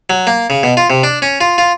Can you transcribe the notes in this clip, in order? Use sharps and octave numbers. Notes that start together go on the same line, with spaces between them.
F#3
A#3
C#3
B2
F4
C3
D4
C#4
F4
F4